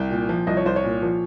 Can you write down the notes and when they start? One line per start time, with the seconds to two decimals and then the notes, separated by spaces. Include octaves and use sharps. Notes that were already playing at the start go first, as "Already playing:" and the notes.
Already playing: C2 G5
0.11 A#2
0.29 F3
0.47 C2 D#5
0.57 C#5
0.66 C2 C5
0.76 C#5
0.84 A#2
1.02 F3